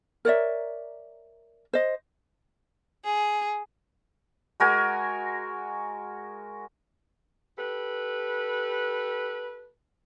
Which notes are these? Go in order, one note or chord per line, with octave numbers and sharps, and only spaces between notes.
A#4 C#5 D5 E5
C5 D#5
G#4
G#3 F#4 A#4 G#5
G4 A4 B4